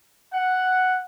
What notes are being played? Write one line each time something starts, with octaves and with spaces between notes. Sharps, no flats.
F#5